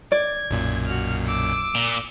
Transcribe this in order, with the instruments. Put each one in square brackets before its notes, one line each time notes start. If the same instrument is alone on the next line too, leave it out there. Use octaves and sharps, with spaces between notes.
[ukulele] D5 [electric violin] G#6
[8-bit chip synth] B1 F#2 A#2
[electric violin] F#4 F6
D6 E6
[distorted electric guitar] A#2